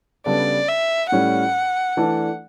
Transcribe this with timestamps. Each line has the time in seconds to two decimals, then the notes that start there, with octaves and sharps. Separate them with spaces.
0.26 C#3 G3 B3 D4 A4 D5
0.68 E5
1.12 A2 G3 C#4 F#5
1.97 E3 A3 D4 A4 D5